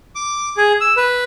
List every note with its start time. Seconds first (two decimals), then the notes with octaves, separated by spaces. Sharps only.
0.15 D6
0.57 G#4
0.81 E6
0.97 B4